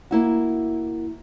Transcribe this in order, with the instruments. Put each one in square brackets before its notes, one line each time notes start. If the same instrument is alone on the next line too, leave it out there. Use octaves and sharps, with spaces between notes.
[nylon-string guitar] A#3 E4 F#4